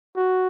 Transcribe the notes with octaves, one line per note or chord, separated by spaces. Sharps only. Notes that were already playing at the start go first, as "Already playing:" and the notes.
F#4